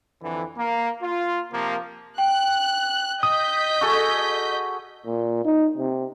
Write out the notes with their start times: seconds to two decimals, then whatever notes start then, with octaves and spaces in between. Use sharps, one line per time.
0.22 F2 D3 E3
0.57 A#3
1.02 F4
1.52 C3 F3 A#3
2.18 G5 F#6
3.23 D#5 D#6 G6 B6
3.81 F#4 G#4 A4
5.06 A#2
5.45 D#4
5.77 C3